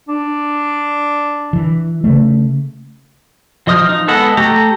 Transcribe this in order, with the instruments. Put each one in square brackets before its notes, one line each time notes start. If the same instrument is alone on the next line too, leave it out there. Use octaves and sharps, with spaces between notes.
[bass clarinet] D4
[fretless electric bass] E3
C#3 A3
[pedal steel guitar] F3 D#5 D#6 F6 G6
F3 D#4
G#3 B3 A4 D#5 F#5
A3 G4 A4 A#5